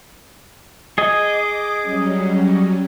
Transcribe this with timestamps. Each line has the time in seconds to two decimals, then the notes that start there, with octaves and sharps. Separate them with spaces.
0.98 G#4 D#5 D6
1.82 F#3 G3 C#4